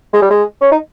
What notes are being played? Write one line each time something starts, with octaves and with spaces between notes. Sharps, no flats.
G#3
G3
G#3
C#4
D#4